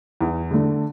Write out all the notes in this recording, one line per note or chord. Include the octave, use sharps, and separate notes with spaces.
E2
D3 A3 D4